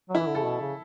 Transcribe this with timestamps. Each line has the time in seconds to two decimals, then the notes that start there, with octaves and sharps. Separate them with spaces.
0.09 F#3
0.15 E3 E4
0.27 D3
0.35 C#3 A4
0.45 B2
0.60 C#3